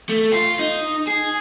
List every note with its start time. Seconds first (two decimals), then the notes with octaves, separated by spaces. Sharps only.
0.09 A3
0.32 F4
0.59 D#4
1.07 G#4